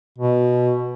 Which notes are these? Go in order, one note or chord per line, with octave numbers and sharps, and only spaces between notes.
B2